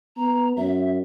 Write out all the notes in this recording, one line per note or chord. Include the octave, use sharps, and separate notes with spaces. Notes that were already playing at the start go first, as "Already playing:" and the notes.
B3 A#5
F#2 E5